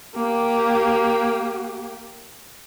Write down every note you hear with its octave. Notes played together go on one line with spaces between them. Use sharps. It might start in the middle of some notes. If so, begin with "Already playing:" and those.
A#3 G4